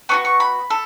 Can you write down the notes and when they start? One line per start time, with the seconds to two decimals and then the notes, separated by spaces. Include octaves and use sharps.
0.09 B3 D4 F#4 C#6
0.25 C#6
0.40 B5
0.70 A4